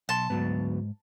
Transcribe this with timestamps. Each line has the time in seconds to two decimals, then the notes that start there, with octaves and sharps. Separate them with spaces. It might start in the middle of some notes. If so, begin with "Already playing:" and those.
0.09 B1 A5 C6
0.30 D2 G#2 F#3 B3